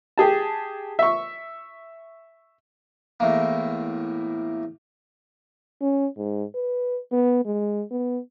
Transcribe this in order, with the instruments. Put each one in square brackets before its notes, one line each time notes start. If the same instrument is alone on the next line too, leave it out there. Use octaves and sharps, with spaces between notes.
[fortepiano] G4 G#4 A5
E5 C#6
[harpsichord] E2 A2 A#3
[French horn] C#4
G#2
B4
B3
G#3
B3